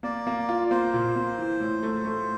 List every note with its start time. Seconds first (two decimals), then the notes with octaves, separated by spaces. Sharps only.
0.03 A#3 D5
0.27 A#3
0.49 F4
0.71 A#3 C5
0.94 A#2
1.16 A#3
1.38 E3
1.60 A2
1.83 A3
2.05 A3